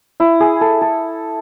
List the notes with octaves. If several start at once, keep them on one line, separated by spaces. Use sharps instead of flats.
E4
G#4
A4
A4